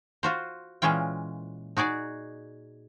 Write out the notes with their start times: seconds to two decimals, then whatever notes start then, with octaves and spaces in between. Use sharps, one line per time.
0.23 F4 F#4 C5
0.82 A#2 E3 G#3 C#4 F4 G5
1.77 D#4 F#4 G#4 D5